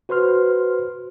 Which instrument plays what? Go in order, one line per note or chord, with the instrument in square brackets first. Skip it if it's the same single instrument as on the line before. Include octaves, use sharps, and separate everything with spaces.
[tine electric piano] F#4 B4 C5 C6 F6